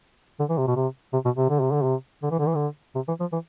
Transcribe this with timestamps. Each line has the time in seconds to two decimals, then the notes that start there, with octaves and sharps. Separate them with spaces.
0.39 D3
0.49 E3
0.58 C3
0.67 B2
0.76 C3
1.13 C3
1.25 B2
1.37 C3
1.49 D3
1.60 C3
1.72 D3
1.83 C3
2.23 D3
2.31 E3
2.39 D3
2.47 E3
2.55 D3
2.95 C3
3.08 E3
3.20 F3
3.32 E3